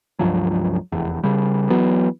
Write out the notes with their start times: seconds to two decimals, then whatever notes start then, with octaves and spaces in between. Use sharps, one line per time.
0.19 C#2 G2 F3 F#3
0.92 F1 E2
1.23 C#3 G3
1.70 E3 F#3 B3